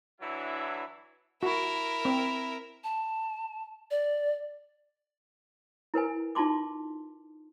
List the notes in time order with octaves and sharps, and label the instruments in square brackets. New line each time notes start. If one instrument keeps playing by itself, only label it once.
[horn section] E3 F#3 D4 E4
[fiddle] E4 A#4 [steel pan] F#4
[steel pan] C4
[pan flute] A5
D5
[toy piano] E4 A#4 B4 G#5
D#4 F4 A5 C6 D6